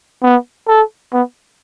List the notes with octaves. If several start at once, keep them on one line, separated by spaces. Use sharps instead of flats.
B3
A4
B3